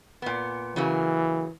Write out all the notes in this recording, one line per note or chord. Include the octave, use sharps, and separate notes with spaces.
A#2 B3
C#3 E3 F#3 A#3